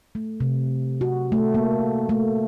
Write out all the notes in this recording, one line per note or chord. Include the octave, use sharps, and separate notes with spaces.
A3
C3
F#4
A3
A#3
A3